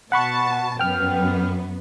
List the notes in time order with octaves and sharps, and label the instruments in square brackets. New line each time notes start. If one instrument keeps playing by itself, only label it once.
[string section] B2 A5 [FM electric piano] F#5 B5 C#6
[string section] F#2 B3 [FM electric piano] G5 F6